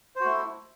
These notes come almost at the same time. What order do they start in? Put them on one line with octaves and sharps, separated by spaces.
C5 F#4 A3 E4